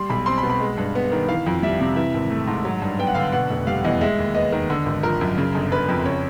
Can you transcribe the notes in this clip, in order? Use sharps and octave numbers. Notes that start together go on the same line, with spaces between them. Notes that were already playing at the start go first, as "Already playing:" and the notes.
Already playing: G3 C6
B1 B5
C4 C6
B5
B2
B5
G#3
G2
B3
D#3
E3 F5
F2
G3 E5
C3
E3 E5
G#1
A3
G#2
F#3
G2
B3 G5
F#5
D3 F5
F#5
B2 F#5
F1
G3 F5
E2 D#5
G#3 E5
D#2
B3 D#5
D#3
D3
G#1
F3 A#4
F#2
C#3
G1
G1 B4
F2
C#3 C#5